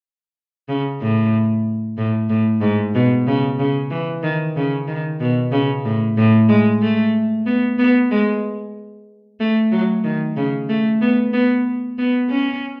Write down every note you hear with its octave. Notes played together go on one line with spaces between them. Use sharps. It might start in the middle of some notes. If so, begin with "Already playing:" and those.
C#3
A2
A2
A2
G#2
B2
C#3
C#3
E3
D#3
C#3
D#3
B2
C#3
A2
A2
G#3
A3
B3
B3
G#3
A3
F#3
D#3
C#3
A3
B3
B3
B3
C#4